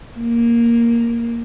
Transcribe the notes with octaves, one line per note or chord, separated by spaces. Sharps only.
A#3